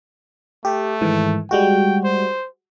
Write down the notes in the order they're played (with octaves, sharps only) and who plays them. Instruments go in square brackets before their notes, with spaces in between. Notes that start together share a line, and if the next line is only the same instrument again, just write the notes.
[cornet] A3 [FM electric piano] G4
[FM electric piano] G#2 D#3 E3
[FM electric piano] G3 G#3 F#4 [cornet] G5
[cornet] C5